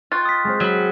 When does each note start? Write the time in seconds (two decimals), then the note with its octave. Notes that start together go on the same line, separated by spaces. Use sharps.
0.12 F4 D#5 G5 C#6 F6 F#6 A6
0.25 D#6 B6
0.44 G#3 C4 C5
0.60 F#3 B5